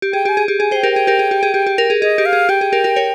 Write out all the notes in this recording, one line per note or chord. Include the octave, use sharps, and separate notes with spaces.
G4
G#4 G5
G4
G#5
G#4
G4
G#4 G#5
G#4 C5
G5
G4 A#4
G#4 G5
G4 A#4
G#4
G4
G#4
G4
G4
G4 A#4
G#4
G#4 D#5
G4
F5
G#4
G4 G5
G#4
G4 A#4
G4 A#4
A#4 C#5